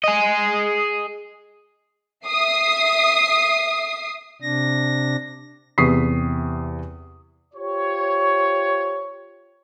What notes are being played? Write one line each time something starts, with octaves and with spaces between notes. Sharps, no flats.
G#4 D#5
E5 D#6 C7
C3 D4 A#6
E2 C3 C#6 D#6 B6 C7
F4 G4 C5 C#5